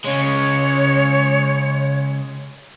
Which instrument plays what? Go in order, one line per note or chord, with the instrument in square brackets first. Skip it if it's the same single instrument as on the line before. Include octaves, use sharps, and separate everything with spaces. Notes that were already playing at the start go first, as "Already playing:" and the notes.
[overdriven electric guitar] C#3 G#3 [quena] C#5